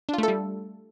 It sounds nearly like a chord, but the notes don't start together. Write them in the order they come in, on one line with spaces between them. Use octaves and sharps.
D4 F4 A3 A4 G3